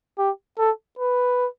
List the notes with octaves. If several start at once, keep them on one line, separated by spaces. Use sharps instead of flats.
G4
A4
B4